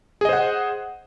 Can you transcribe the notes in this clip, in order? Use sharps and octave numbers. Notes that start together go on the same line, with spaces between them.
G#4 C5 D#5 F#5